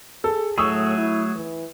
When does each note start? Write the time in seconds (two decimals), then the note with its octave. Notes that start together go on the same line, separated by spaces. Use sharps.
0.24 G#4 A4
0.58 A2 F#3 A3 G#4 C#6 D#6 E6
0.98 E4
1.36 E3